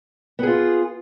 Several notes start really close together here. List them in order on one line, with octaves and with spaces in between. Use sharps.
B3 G#4 F4